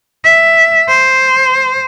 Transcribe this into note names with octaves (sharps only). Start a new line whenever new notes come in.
E5
C5